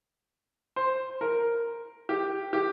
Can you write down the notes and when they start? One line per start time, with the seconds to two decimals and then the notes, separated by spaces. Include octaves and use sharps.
0.76 C5
1.21 A#4
2.09 G4
2.53 G4